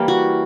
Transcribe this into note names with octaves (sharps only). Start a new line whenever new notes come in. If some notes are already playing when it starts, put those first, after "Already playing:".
Already playing: E3 G3 A#3
F#4